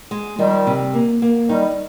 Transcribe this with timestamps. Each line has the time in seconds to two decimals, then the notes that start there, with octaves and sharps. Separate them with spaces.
0.11 G#3
0.38 D#3 F3 G3
0.67 C3
0.94 A#3
1.22 A#3
1.49 D#3 G3 D#4